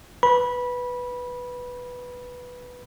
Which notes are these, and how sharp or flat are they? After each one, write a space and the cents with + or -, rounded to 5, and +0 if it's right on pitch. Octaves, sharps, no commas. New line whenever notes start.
B4 +0 B5 -20